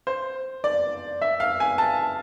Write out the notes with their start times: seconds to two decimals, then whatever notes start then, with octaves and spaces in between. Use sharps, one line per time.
0.07 C5
0.64 D5
1.22 E5
1.40 F5
1.60 G#5
1.78 A5